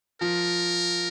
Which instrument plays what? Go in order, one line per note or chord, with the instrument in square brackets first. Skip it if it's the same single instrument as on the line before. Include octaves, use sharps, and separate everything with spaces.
[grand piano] F3 [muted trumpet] A#4